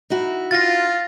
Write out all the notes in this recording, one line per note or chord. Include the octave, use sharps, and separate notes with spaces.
D#4 E4 F#4
F4 A6 A#6